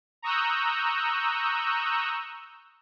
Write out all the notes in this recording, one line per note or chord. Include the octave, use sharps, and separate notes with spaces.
A#5 C#6 D#6 E6 F#6 G6